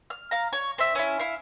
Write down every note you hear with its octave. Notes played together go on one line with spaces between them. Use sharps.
F6
F5 A#5
C#5
C4 E5
C#4 E4
E4 F5